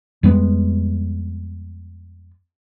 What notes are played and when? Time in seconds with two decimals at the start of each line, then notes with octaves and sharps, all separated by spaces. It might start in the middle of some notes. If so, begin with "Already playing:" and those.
0.23 F2 G3 G#3 B3